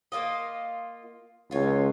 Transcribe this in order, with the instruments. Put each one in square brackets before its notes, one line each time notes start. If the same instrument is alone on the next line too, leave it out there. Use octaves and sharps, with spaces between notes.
[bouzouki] A#3 F4 D#5
[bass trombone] C#2 [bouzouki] F4 C#5